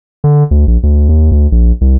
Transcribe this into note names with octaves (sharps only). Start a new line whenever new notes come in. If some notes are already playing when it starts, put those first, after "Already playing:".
D3
D2
A#1
D2
D#2
D2
A#1
C2